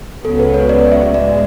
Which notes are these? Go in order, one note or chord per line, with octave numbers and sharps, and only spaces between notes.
C#2 C#3 F#3 B3 A4
B4
C#5
D5
E5
A2 G#3 D5